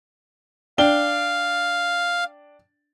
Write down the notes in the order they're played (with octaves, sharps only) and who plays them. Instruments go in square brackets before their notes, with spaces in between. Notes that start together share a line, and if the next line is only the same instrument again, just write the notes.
[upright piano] D4 G5 G7 [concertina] F5